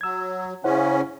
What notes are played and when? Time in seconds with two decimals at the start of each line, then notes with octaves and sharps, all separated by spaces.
0.01 F#3 E6 G#6
0.64 C#3 C#4 E4 C5 F#5